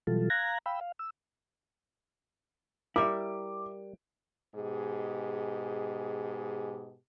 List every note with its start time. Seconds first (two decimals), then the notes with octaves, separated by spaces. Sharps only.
0.07 B2 E3 F#3 G3 F4 A4
0.30 F5 A#5 F#6 G#6 A#6
0.66 F5 G5 B5 E6
0.81 F5
0.99 E6
2.96 G3 E4 A#4 E5 D6
4.55 G#2 B2 G4 G#4